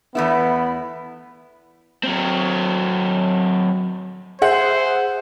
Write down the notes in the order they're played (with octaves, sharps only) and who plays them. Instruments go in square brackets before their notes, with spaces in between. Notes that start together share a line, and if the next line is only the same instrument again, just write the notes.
[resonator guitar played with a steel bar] E2 A3 E4 [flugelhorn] B3
[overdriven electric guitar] F#3 C4
[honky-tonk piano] G#4 E5 F#5 [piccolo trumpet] C5